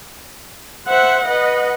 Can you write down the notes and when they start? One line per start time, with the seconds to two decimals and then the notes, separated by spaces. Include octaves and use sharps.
0.87 C5 E5 F#5
1.27 B4 D#5 F#5